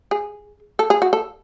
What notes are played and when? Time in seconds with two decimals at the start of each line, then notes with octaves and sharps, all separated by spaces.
0.11 G#4
0.79 A4
0.90 G#4
1.02 F#4
1.13 A4